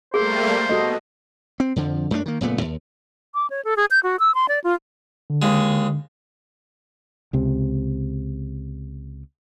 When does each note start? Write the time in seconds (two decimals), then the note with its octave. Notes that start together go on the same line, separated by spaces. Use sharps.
0.14 G3 A3 A#3 G#4 A#4 C5
0.69 B2 F#4 A4 D#5
1.60 C4
1.76 F2 D3 F3
2.11 F#2 A3 A#3 D4
2.26 D#3 A#3
2.41 F#1 A#2 A3 B3
2.61 D#2
3.34 D6
3.50 C#5
3.64 A4
3.76 G#4
3.91 G6
4.03 F#4
4.19 E6
4.35 C6
4.48 D5
4.64 F4
5.30 D3
5.42 D#2 G#3
7.33 C#2 C3